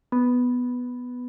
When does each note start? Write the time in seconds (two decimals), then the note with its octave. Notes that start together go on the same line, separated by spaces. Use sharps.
0.12 B3